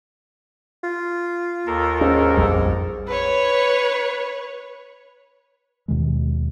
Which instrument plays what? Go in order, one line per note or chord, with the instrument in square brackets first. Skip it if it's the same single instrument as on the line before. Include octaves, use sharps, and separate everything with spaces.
[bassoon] F4
[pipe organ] D#2 A4 A#4
[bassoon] G#2 [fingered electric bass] C#4
[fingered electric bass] A#1 F2 G3
[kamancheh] B4 C#5
[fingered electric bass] D#2 B2 D#3 G#3